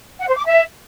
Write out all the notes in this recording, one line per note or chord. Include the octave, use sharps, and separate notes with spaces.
F#5
C5
D6
E5